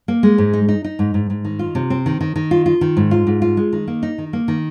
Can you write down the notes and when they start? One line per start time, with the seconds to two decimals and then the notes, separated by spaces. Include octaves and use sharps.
0.08 A#3
0.23 G#3
0.38 G#2
0.53 D#4
0.68 D#4
0.84 D#4
0.99 G#2
1.14 G#2
1.30 G#2
1.45 D#3
1.59 F4
1.75 C3
1.90 C4
2.06 D#3
2.21 D#3
2.36 D#3
2.51 F4
2.66 F4
2.81 D#3
2.97 G#2
3.11 F4
3.27 G#2
3.42 F4
3.57 G#3
3.73 D#3
3.88 A#3
4.03 D#4
4.18 D#3
4.33 A#3
4.48 D#3